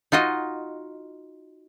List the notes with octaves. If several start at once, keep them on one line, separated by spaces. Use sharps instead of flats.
D#4 F4 F#4 D#5